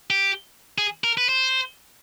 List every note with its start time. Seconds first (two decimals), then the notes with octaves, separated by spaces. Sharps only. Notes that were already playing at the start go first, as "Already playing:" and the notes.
0.10 G4
0.78 G#4
1.04 A#4
1.17 B4
1.29 C5